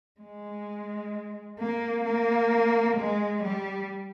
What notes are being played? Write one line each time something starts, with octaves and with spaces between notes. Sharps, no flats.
G#3
A#3
A#3
G#3
G3